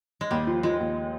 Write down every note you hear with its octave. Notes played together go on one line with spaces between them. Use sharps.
G#3
D#2 G3
F3
F3 G#3
D#2